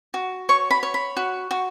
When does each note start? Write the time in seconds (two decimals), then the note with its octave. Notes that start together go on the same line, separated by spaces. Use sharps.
0.14 F#4
0.49 C#5 C#6
0.71 B5
0.83 C#5
0.94 B5
1.17 F#4
1.51 F#4